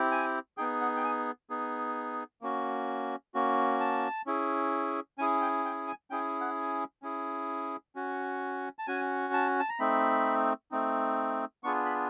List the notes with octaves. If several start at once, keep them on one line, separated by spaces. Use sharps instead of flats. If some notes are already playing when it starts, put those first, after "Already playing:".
Already playing: C4 E4 G4
G#5
B3 D#4 G#4 G5
F#5
G5
G#5
B3 D#4 G#4
A#3 C#4 F#4
A#3 C#4 F#4
A5
C#4 E4 G#4
C#4 E4 G#4 G#5
G5
G5
G#5
C#4 E4 G#4 G5
F#5
C#4 E4 G#4
C#4 F#4
A5
C#4 F#4 G#5
A5
A5
A#5
A3 C4 D#4 B5
A3 C4 D#4
B3 D4 F4 G#4 C#6
B5